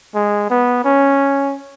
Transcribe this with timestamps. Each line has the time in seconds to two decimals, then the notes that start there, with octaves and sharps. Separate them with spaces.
0.14 G#3
0.50 B3
0.84 C#4